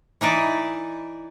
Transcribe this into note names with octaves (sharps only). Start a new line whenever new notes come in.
E3 D#4 E4 D5